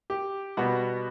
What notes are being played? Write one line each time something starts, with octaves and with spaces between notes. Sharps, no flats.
G4
B2 G3 B3 F#4